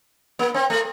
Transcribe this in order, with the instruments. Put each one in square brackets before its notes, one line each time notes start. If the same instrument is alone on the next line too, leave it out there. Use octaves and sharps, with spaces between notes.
[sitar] A#3
C4
A3